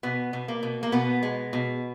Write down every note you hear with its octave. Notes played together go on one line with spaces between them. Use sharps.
B2 B3
B2
A#3
B2
A#3
B2 B3
G#3
B2